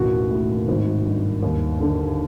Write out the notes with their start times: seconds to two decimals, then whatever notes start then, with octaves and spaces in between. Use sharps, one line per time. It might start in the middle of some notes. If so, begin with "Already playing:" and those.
Already playing: E1 A1 D#2 F#4
0.31 A2
0.68 G#1
1.06 G2
1.43 D#2
1.80 D3